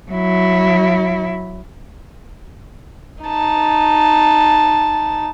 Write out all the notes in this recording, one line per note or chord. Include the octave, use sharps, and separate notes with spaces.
F#3 E4
D#4 A5